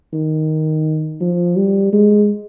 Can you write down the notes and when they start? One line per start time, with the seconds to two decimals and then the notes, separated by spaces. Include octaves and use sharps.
0.13 D#3
1.21 F3
1.57 G3
1.93 G#3